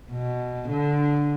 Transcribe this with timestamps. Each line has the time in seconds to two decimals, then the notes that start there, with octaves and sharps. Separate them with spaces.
0.11 B2
0.68 D3